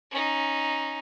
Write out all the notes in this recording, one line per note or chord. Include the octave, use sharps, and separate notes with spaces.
C#4 D#4